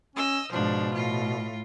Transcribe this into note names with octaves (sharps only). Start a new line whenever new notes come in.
C#4 D#5 E6
G#2 B2 F3 D4
A2 F4